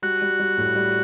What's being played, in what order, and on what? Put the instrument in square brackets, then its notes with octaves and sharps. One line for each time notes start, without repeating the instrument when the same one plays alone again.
[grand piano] G3 [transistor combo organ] F#4
[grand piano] G3
G3
A2
G3